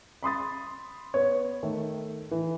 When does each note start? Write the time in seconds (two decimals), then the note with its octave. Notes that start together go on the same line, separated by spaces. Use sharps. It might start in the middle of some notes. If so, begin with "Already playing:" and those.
0.23 B5 C6 D#6 A6
1.14 B3 C#5
1.63 D#3 A3
2.31 E3